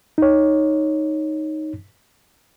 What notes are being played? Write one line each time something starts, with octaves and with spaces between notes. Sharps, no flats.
D#4 C#5